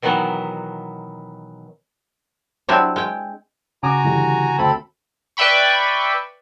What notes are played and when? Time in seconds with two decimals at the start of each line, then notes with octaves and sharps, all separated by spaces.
0.02 B2 D#3 E3 F#3 B3
2.69 F#3 G3 C4 D4 E4
2.96 G#3 G5
3.83 C#3 F#4 G#5 A#5 D6
4.04 D3 E3 G3
4.58 D2 C4 A4 B5
5.37 B4 D5 E5 G5 B5 C#6